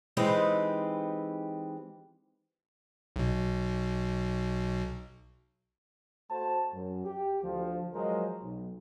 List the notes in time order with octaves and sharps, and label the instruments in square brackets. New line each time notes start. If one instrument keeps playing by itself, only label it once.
[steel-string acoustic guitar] E3 G#3 C4 D#4 G4 B4
[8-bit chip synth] B1 B2
[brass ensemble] A3 F#4 C5 A5
F#2
G4
D2 F3
F3 F#3 G#3 A#4 C5 D#5
B1